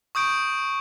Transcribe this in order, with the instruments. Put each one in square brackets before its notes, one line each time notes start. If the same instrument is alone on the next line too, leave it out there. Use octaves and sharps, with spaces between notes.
[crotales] C#6 D#6 G6 D7